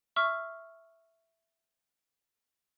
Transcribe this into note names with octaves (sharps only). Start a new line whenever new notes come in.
E5 C#6 E6 F6